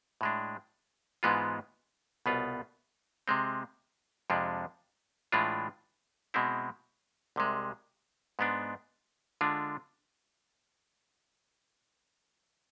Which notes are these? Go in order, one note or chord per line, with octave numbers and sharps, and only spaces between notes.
A2 G#3 D4
G#2 E3 G#3 B3 F4
C2 B2 B3 F4
C3 G#3 C4
F2 C3 F3 G#3 D4
A2 E3 G#3 D4 F4
B2 G#3 C4 E4
C2 C3 G#3
G#2 G#3 B3 D4
D3 G#3 D4 F4